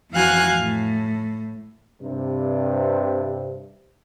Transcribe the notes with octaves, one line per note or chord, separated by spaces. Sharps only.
F2 E3 F#4 F5 G#5 F#6
A2
G2 C3